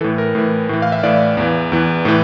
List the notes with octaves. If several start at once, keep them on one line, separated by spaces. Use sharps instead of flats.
A2 E3 A4
A#4
A2 E3
A2 E3
F5
E5
A2 E3 D5
E2 E3
E2 E3
A2 E3